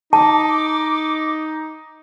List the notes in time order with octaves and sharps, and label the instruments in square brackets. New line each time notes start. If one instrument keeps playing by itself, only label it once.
[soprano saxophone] D#4 [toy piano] A5 [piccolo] D6